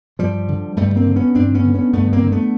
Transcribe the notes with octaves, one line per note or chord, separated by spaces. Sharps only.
G2 F3 G3
D3
G2 G3 A3
A#3 C4
D3
B3 C#4
G2 C4 D4
B3 C#4
D3
B3 C#4
G2 A3 B3
A#3 C4
D3
A3 B3